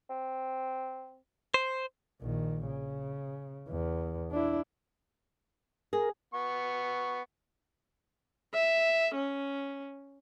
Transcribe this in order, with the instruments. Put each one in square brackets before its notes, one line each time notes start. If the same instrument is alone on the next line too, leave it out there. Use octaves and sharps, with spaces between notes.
[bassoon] C4
[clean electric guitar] C5
[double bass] A#1 D#3
C#3
E2
D4 E4
[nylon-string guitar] G#4 [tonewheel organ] A#4
[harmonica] B3 C#6
[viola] E5
C#4